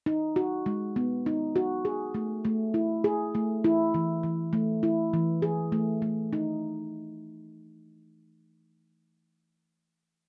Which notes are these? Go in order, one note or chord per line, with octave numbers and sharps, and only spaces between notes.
D#4
F#4
G#3
B3
D#4
F#4
G#4
A3
A3
E4
G#4
A3
E4
E3
E3
A3
E4
E3
G#4
A3
A3
D#4